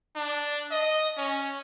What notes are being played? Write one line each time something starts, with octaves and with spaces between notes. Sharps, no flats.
D4
D#5
C#4